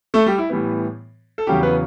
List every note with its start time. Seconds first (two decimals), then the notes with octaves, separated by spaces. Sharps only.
0.14 A3 A4
0.26 G3 G4
0.38 E4
0.50 A2 E3 G3 B3
1.38 A4
1.47 E2 C#3 F#3 G3 G4
1.63 B3 B4